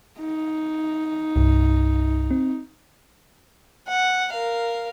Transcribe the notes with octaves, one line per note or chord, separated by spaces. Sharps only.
D#4
C2 G2
C4
F#5
A#4 F5